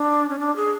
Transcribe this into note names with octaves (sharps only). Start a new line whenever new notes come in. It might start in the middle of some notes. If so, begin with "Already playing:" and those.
Already playing: D4
C#4
D4
G#4